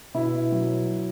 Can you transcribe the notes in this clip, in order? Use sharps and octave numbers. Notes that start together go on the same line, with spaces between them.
B2 E4
F#3